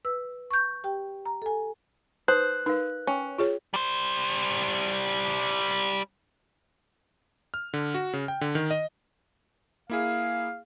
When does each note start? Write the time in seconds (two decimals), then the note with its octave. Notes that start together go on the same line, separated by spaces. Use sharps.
0.05 B4 E6
0.50 C#6 G6
0.84 G4 G5
1.25 A#5
1.42 A4 G#5
2.28 D#4 B4 C5 D#6 F#6
2.66 D#4 A#4 B4 F5
3.07 C#4 G5 D6
3.38 F4 G#4 C#5
3.74 G3 C5
7.54 F6
7.74 D3
7.95 F#4
8.13 C#3
8.28 G5
8.41 D3
8.55 D#3
8.71 D#5
9.90 A#3 E4 G#4 F5